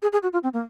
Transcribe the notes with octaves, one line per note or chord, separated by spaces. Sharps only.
G#4
G#4
F#4
F4
C4
A#3